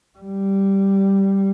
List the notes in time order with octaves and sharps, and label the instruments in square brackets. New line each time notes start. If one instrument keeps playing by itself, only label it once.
[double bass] G3